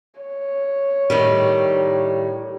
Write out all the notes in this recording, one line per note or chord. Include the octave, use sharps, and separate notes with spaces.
C#5
A2 D#3 G3